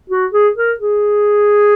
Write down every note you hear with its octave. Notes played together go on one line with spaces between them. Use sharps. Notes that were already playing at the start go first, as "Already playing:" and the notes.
F#4
G#4
A#4
G#4